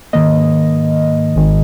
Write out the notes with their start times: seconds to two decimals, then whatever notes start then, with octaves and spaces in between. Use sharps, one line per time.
0.13 G#2 D#3 A#3 D#5
1.36 G#1 G#2 D#3 G#3